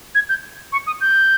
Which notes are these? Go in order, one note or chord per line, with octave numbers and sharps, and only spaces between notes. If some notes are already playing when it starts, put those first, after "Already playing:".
G#6
G6
C#6
D#6
G6